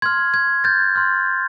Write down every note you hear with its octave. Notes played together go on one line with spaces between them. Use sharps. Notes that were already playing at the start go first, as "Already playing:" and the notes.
C6 F6 G#6
G#6
G6 A6
C6 F6